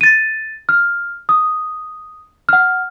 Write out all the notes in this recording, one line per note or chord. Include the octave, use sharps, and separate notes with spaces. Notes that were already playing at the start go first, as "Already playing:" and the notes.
A6 D#7
F6
D#6
F#5 F6